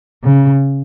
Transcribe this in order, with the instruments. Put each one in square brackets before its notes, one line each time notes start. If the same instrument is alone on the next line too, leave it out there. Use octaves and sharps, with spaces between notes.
[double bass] C#3